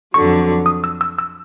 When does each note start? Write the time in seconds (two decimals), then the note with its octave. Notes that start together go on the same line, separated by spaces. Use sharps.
0.14 F2 D3 F#3 C#6
0.66 D#6
0.84 E6
1.01 E6
1.18 E6